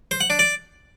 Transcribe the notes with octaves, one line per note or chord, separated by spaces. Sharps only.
C5
F#5
D4
D5